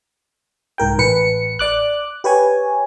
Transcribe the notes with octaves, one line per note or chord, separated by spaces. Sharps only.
C2 G#2 A#4 G5
A1 B4 C#7
D5 D6 F#6
G4 B4 C#5 G#5